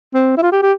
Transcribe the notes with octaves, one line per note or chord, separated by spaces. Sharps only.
C4
E4
F4
G4
G4